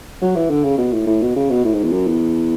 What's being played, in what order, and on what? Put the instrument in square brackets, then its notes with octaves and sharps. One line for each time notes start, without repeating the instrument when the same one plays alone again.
[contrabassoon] F#3
E3
D3
C#3
B2
A2
A2
B2
C#3
B2
A2
G#2
E2
F#2
E2